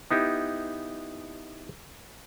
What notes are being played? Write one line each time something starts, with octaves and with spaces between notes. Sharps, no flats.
B3 D#4 E4 G4